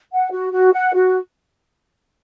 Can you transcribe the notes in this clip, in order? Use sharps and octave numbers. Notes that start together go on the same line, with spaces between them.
F#5
F#4
F#4
F#5
F#4